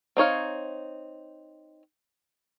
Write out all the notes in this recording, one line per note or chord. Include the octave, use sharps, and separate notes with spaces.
C4 D#4 C#5 F5